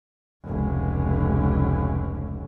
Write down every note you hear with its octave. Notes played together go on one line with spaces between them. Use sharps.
F1 C#2